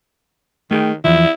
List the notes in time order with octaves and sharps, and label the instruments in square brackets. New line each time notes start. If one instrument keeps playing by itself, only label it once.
[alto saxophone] D#3 [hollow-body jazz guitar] A3 G#4 G5
[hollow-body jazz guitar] E2 E3 F3 [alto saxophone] E4